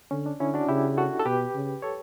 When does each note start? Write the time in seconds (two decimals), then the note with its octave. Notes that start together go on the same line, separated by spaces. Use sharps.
0.11 D3 C#4
0.26 D4
0.40 D3 C#4 E4
0.54 D4 F#4
0.68 C#3 E4 G4
0.97 F#4 A4
1.20 A4
1.26 B2 G4 B4
1.55 C#3
1.82 A4 C#5